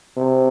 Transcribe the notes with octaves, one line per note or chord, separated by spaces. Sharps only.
C3